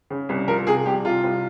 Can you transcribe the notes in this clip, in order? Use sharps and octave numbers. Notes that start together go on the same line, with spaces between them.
C#3
C2
F3 A#4
C3 G#4
C2 G4
C3 F4
C2